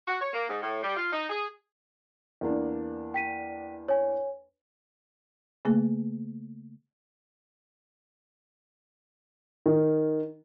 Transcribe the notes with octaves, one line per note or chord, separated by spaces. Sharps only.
F#4
C#5
A#3
G#2
A2
G3
F4
D#4
G#4
E2 A#3 D4
G5 B6 D#7
C#5 G#5
C#3 A3 A#3 G#4
D#3